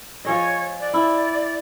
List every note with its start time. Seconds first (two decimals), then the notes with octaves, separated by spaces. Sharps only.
0.25 F3 G#4 C#5 D#5
0.80 D5
0.94 E4